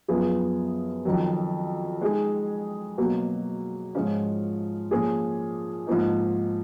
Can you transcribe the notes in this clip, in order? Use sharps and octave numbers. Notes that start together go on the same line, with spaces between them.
F#2 F3 B3 F4 G#4
F2 D#3 F#3
G#3 D#4 G#4
B2 F#3 A#3
G#2 F3 G#3 C#4 F4
A#2 F3 A#3 C#4 G#4
G#2 F3 A#3 D#4